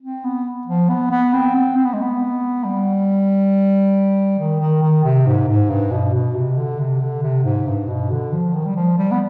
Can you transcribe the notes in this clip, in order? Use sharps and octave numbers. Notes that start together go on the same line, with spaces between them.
C4
B3
F3
B3
B3
C4
C4
C4
B3
G#3
B3
G3
D#3
D#3
D#3
C3
G#2
G#2
G2
B2
B2
C3
D3
C3
D3
C3
G#2
G2
B2
D3
F3
D#3
G3
F3
G3
B3